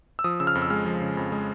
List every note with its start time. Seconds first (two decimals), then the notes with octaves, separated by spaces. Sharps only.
0.19 E6
0.24 F3 D#6
0.40 C#3 E6
0.47 F6
0.55 F2
0.62 E6
0.70 G#3 F6
0.86 F3
1.02 C#3
1.17 F2
1.32 G#3